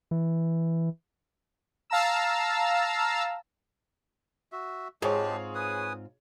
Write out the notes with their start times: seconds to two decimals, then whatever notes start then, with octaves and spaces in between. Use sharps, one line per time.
0.11 E3
1.90 F5 A5 A#5 E6
4.52 F#4 E5
5.02 G#2 G#3 C4 F4 G4 G#4 C#5 A5
5.55 B4 G#5 D#6